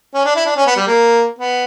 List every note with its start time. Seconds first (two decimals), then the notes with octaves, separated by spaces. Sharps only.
0.14 C#4
0.25 D4
0.36 E4
0.46 D4
0.56 C#4
0.67 B3
0.76 G3
0.87 A#3
1.39 B3